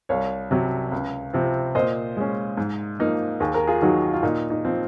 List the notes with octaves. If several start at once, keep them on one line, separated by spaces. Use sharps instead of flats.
C2 C#5 F5
C3 F#3
C#2
C3 F3 C4
A#2 C5 D#5
G#3 C#4
G#2
F3 A#3 D#4
D#2 G#4
A#4
F4 G#4
D#3 F#3 D#4 F#4
F4
A#2 D#4
D#4
F3 C4